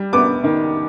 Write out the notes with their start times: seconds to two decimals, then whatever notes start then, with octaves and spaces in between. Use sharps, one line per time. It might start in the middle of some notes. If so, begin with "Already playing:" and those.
Already playing: G3
0.13 B3 D6
0.44 D#3